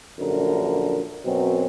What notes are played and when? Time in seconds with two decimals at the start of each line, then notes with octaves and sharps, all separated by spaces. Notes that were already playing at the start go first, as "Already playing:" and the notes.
0.19 A#1 F#2 D3 A#4
1.25 F#2 B2 F#3 C4